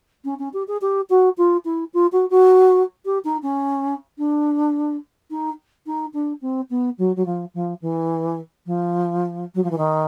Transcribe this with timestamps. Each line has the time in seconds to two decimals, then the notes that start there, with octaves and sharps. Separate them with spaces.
0.25 C#4
0.39 C#4
0.53 G4
0.68 G#4
0.81 G4
1.10 F#4
1.38 F4
1.65 E4
1.94 F4
2.12 F#4
2.30 F#4
3.05 G4
3.25 D#4
3.43 C#4
4.18 D4
5.31 D#4
5.86 D#4
6.13 D4
6.42 C4
6.70 B3
6.98 F#3
7.16 F#3
7.26 F3
7.54 F3
7.82 E3
8.66 F3
9.55 F#3
9.64 F3
9.71 E3
9.78 D#3